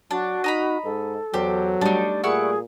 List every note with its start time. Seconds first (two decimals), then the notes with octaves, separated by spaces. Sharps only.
0.11 F#3 D4 F#4
0.44 D#4 D#5 A#5 B5
0.84 G#2 A4
1.34 E2 F#3 G4 C5
1.81 G3 A3 D4 D#4
2.24 A#2 E4 G#4 F#5 C#6